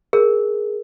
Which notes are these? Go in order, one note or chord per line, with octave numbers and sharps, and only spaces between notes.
G#4 A#4